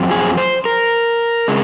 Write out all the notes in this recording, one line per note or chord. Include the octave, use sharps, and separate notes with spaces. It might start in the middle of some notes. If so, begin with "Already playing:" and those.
Already playing: F#2 F3 C4
G#4
C5
A#4
C#3 G#3